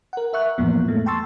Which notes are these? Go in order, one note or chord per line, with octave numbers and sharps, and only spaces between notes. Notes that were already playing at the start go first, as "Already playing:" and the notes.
A#4 F#5
A#4 E5 C#6 F#6
F2 A2 E3 F3 A#3 B3
G#3 A3
G5 A5 C6 C#6 E6 A6